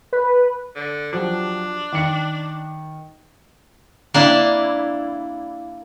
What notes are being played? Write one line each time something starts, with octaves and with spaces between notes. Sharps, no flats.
B4
D3
F3 F#3 D4 G4
D#3 C#7
A#3 D4 E4